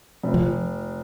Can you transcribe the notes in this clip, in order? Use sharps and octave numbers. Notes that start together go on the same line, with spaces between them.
F1
F3